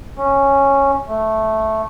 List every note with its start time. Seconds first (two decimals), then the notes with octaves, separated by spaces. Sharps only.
0.17 C#4
1.07 A3